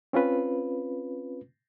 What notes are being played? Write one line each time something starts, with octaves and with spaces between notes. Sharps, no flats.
C4 C#4 F4 B4